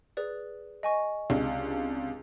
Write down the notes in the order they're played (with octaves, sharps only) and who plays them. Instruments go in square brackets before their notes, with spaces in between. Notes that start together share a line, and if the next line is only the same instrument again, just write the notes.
[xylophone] G#4 B4 D5
D#5 G#5 C#6
[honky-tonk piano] C#2 C3 D4